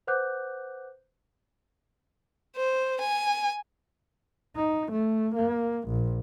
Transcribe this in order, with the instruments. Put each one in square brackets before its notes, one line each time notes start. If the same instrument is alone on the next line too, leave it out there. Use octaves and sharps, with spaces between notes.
[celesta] B4 C5 F#5 D6 F#6 G6
[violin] C5
G#5
[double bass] D#4
A3
A#3
A#1